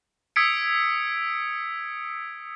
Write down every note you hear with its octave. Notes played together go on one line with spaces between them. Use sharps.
D#6 E6 G#6 B6 C#7 D7